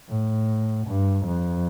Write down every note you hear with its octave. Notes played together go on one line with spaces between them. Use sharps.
A2
G2
F2